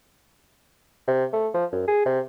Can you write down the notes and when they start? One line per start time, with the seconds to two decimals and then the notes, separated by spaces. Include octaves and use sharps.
1.07 C3
1.33 A3
1.54 F3
1.72 F#2
1.87 G#4
2.05 C3